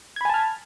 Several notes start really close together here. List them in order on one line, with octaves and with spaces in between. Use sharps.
G#6 B5 G#5 A5 F6